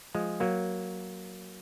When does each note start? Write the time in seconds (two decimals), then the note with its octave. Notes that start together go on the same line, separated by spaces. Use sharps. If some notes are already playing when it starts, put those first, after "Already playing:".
0.14 F3 G#3
0.40 F#3 A#3